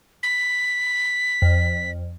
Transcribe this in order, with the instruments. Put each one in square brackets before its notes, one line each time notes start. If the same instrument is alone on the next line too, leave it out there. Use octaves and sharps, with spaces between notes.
[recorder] B6
[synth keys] F2